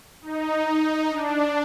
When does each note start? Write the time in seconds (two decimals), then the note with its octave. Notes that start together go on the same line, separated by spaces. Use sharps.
0.22 D#4
1.09 D4